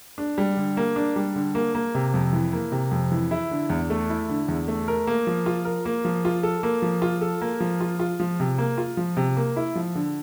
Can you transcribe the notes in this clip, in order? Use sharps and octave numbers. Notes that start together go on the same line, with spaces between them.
D4
G3
D3
A#3
D4
G3
D3
A#3
A#3
C3
F2
E3
A#3
C3
F2
E3
E4
D3
E2
A3
E4
D3
E2
A3
A#4
A#3
F3
F4
A#4
A#3
F3
F4
A4
A#3
F3
F4
A4
A#3
F3
F4
F4
F3
C3
A#3
F4
F3
C3
A#3
E4
F3
D3